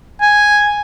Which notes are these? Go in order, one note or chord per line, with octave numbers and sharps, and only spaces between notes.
G#5